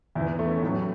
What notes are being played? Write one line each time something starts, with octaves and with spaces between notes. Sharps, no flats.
E2 E3 E4
B3
A3
C#4
A2 F#3